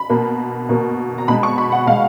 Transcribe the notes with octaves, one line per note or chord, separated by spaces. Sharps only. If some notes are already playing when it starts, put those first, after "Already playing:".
Already playing: B5
B2 A#3
B2 A#3
A#5
B2 G#3 B5
C#6
B5
F#5
B2 G#3 F5